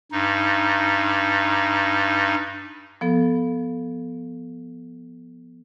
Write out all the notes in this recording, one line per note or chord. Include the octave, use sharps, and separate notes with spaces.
G2 D#4
F3 B3 A4